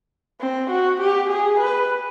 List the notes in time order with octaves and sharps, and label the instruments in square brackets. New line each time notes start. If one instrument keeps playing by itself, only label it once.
[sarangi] C4
F#4
G4
G#4
B4